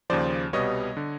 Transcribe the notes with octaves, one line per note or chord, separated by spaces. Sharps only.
D#2 C#3 F3 C5 D5
C2 B2 G3 B3 C#5 D#5
D3